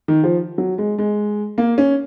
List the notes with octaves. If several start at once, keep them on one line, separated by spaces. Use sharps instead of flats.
D#3
F3
F#3
G#3
G#3
A#3
C#4